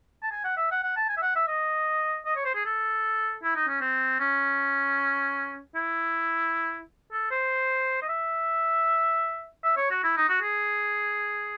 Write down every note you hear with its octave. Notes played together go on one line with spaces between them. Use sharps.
A5
G#5
F#5
E5
F#5
F#5
A5
G#5
E5
F#5
E5
D#5
D#5
C#5
C5
G#4
A4
E4
D#4
C#4
C4
C#4
E4
A4
C5
D#5
E5
E5
C#5
F#4
E4
D#4
F#4
G#4